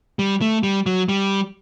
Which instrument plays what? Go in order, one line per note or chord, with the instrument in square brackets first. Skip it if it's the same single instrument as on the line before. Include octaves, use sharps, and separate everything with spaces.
[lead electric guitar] G3
A3
G3
F#3
G3